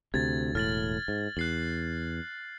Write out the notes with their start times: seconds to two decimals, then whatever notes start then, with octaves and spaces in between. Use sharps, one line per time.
0.14 D2 C3 G#6 A6
0.55 E1 A2 F6 A6 F#7
1.08 G#2
1.37 E2 F#6 C7 F#7